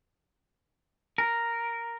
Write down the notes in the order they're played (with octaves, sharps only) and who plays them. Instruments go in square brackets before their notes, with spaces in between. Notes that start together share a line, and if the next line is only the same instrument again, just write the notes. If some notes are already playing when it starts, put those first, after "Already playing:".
[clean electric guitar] A#4